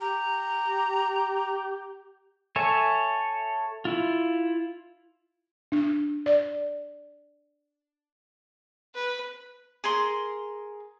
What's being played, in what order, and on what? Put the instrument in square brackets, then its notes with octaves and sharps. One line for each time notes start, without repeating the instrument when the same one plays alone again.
[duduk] G4 [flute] A#5
[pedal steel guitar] A4 C#5 E5 G#5
E4 F4
[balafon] D4
D5
[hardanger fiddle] B4
[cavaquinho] G#4 A#4 C6